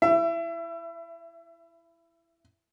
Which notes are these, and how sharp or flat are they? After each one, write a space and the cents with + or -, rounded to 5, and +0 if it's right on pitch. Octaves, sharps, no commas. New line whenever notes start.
E4 +10 E5 +30